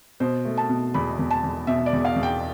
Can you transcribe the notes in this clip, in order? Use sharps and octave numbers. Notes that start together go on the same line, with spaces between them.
B2 C5
A3
A5
B2
E2 B5
E2
A5
E2
B2 E5
D5
E2
F5
E2
G5